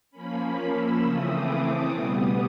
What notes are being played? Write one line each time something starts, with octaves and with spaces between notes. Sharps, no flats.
F3 A#3 C#4 B5
B5
E6
C#3 E3 A3 C4 D#6
D6
D6
B2 G3 B3 D#6